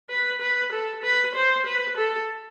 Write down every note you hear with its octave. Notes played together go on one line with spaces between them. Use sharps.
B4
B4
A4
B4
C5
B4
A4